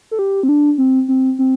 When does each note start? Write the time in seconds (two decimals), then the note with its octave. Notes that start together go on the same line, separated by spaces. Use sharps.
0.11 A4
0.19 G4
0.43 C4
0.49 D4
0.78 C4
1.08 C4
1.39 C4